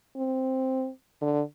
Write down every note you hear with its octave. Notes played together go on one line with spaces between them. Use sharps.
C4
D3